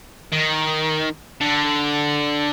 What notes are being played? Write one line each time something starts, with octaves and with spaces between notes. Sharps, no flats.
D#3
D3